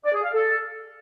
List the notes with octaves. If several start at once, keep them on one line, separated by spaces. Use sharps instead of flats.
D5
G#4
F5
A4